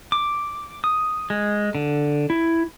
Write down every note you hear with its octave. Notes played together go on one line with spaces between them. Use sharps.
D6
D#6
G#3
D3
E4